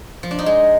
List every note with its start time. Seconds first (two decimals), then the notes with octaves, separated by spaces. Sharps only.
0.23 F3
0.31 D4
0.39 D#4
0.46 G#3